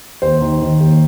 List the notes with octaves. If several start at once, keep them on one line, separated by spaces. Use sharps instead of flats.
D#2 C5
D#3
D#3
D#2